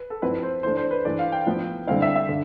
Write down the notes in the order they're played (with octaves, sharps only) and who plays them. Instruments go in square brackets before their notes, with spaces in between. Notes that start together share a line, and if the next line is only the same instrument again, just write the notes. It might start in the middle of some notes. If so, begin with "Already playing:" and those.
Already playing: [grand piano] B4
A4
[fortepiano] F3 C4 E4 [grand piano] B4
[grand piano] C5
[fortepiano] E3 A3 D4 [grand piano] C5
[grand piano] C5
B4
[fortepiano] E3 A3 D4 [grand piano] D5
[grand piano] F5
G5
[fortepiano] A2 F3 B3 E4
[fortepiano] D3 G3 C4 E4 [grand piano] F5
[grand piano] E5
E5
[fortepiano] D3